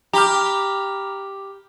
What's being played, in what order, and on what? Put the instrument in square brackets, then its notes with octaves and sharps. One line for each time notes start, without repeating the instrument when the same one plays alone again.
[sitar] G4 [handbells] A#5 B5 F6